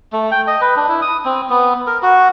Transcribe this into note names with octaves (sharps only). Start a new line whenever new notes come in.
A3
G5
D#5
B4
D4
E4
D#6
C4
B3
A#4
F#4